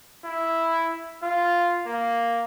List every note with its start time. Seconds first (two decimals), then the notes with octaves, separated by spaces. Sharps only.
0.25 E4
1.23 F4
1.87 A#3